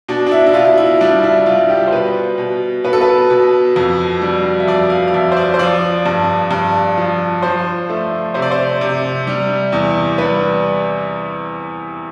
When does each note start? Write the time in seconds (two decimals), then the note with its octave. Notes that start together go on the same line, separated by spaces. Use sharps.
0.08 B2 D4
0.26 D4
0.31 E4
0.46 E4
0.54 B2 F4
0.78 E4
1.01 G3 D4
1.23 E4
1.46 G3 F4
1.70 G4
1.88 C5
1.92 B2 B4
2.38 B2
2.84 B2 B4
2.93 A4
3.01 B4
3.30 B2
3.76 F2
4.21 G3
4.60 E5
4.68 F2 D5
4.90 F5
5.08 F5
5.14 F2 E5
5.32 C5
5.37 D5
5.54 C5
5.59 F3 D5
6.06 G2
6.51 G2
6.98 F3
7.42 F3 C5
7.90 A3
8.34 C3 C5
8.42 D5
8.51 C5
8.81 C3
9.27 G3
9.72 E2
10.18 G3 B4